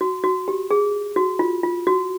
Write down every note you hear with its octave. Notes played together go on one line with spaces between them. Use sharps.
F#4
F#4
G4
G#4
F#4
F4
F4
F#4